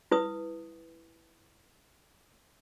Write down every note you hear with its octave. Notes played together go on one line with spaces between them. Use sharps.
E4 B4 D#6